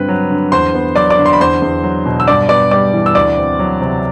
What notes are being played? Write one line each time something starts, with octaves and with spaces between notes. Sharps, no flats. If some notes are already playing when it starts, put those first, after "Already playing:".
Already playing: G2 D3 C4 B4
F#3
D3
E2 C5 C6
B3
F#3 D5 D6
D5 D6
D3
C6
B5
E2 C5 C6
E2
F#3
B2
E6
G2 D5 D6
B3 D5 D6
G3 D5 D6
E3
E6
D2 D5 D6
C4
F#3
C3